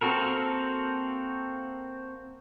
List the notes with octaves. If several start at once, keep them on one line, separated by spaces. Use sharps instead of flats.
A#3 C4 F#4 A4 A#4